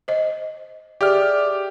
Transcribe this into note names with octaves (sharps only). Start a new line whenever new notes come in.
C5 D#5
G4 G#4 D5 E5 F6